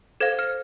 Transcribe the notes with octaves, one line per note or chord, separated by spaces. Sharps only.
A4 C5 F5 G#6
F6